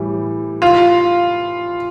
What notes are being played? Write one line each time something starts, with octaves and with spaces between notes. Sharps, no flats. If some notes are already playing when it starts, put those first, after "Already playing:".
Already playing: A2 E3 G3
F4